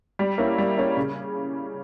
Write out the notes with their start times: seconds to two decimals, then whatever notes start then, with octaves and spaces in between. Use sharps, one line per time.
0.19 G3
0.38 A#3 C#4 E4
0.58 G3
0.77 A#3 C#4 E4
0.97 C#3